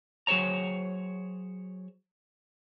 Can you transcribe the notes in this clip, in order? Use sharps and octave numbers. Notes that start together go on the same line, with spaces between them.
F#3 G#4 C5 C#5 A#5